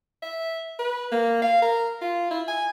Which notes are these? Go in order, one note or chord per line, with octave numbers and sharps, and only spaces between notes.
E5
B4
A#3
F5
A#4
F4
E4
G#5